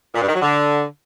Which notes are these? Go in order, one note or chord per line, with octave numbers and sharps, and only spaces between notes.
A#2
G2
D#3
F#3
D3